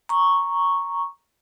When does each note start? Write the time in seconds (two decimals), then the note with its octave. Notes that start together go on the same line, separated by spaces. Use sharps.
0.09 A#5 C#6